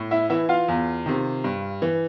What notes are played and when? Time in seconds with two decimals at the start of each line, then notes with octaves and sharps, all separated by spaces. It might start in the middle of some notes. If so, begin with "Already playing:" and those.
Already playing: A2
0.11 E4 E5
0.30 E3 E4 E5
0.49 F4 F5
0.68 E2
1.06 C3 D#3
1.44 G2
1.82 E3